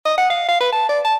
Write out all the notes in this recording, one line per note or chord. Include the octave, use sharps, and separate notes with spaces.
D#5
F#5
F5
F5
B4
A5
D5
A5